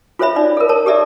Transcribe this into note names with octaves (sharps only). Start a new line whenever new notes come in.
F4 A4 C5 C#5 E5 B5
D#4 D5
A4 A#4
A#4 C#5 A5
G4 A4 D5 E5